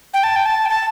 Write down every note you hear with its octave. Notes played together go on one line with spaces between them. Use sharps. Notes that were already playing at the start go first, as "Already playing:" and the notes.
G5
A5
G5
A5
G5
A5